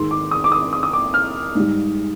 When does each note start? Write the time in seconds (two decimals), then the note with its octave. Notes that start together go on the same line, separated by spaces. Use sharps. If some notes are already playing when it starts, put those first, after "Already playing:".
Already playing: G#2 D#3 G#3 C6
0.11 D6
0.31 D#6
0.44 D6
0.52 D#6
0.73 D#6
0.83 D#6
0.93 D6
1.14 F6
1.55 G#2 G3